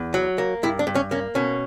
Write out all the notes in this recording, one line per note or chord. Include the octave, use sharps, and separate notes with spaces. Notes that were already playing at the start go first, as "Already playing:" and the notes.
Already playing: E2
F#3
A#3
G2 E4
D4
G2
C#4
A#3 C#4
B2 C#4